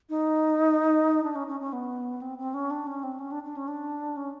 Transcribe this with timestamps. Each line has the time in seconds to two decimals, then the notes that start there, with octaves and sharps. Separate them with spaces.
0.09 D#4
1.24 D4
1.35 C#4
1.48 C#4
1.60 C#4
1.73 B3
2.21 C4
2.38 C4
2.54 C#4
2.71 D4
2.87 C#4
3.03 C4
3.20 C#4
3.31 D4
3.44 D4
3.56 C#4
3.68 D4
4.17 C#4